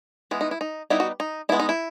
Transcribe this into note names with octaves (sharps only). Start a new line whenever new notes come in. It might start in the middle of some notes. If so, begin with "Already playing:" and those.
E3 G#3 B3
D#4
E4
D#4
G3 B3 D#4 E4
F#4
D#4
D#4 E4
G#3 B3
D#4
E4